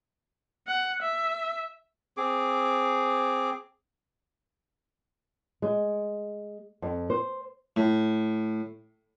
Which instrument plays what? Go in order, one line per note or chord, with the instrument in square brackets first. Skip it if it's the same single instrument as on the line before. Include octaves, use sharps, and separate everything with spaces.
[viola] F#5
E5
[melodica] C4 G#4 D6
[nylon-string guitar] G#3
F2
C5
[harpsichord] A2